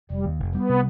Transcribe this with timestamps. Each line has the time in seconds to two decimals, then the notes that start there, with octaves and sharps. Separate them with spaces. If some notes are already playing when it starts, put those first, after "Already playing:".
0.10 F1 G3
0.25 D#2
0.40 F1
0.54 G3 B3
0.69 C3